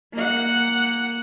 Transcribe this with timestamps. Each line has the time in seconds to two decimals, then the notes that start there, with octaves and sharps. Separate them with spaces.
0.13 A#3 F#5